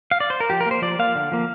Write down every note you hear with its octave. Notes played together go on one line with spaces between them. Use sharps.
F5
D5
C5
A#4
F3 G4
A#4
A#3 C5
F3 D5
A#3 F5
D3
F3 A#3